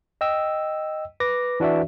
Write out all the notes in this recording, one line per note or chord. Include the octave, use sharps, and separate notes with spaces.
D#5 G5 E6
B4 D6 A#6
E3 D4 F#4 D5 E5